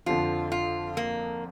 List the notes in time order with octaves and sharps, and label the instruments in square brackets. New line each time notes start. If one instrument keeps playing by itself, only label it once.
[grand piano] F2 D3 F3 [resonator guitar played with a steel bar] F4
[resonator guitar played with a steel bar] F4
A#3